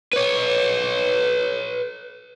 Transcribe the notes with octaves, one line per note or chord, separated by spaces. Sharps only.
B4 C#5